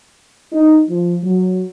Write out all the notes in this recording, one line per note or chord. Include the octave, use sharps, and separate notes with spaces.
D#4
F3
F#3